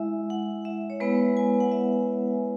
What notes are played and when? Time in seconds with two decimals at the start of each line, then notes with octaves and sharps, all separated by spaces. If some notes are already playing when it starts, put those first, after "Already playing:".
Already playing: G#3 E4 E5
0.30 F#5
0.65 E5
0.90 C#5
1.00 G#3 B3 E4 B4
1.37 G#5
1.60 F#5
1.71 E5